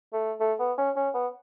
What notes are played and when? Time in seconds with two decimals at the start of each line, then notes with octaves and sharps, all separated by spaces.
0.13 A3
0.40 A3
0.60 B3
0.78 C#4
0.96 C#4
1.14 B3